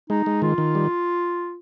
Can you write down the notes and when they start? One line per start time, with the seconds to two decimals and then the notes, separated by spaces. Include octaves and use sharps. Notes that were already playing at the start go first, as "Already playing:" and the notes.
0.10 G#3 D#4
0.26 G#3
0.42 D#3 F4
0.58 D#3
0.75 G3